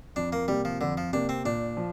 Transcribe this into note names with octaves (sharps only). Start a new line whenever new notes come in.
F2 D4
A#3
C3 G3 A#3
F3
F2 D3
F3
C3 A#3 D4
C4
A#2 D4
F3